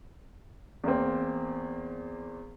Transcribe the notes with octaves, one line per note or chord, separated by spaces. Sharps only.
E2 A#3 C4